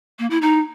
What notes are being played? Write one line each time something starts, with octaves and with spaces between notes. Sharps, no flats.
A#3
E4
D#4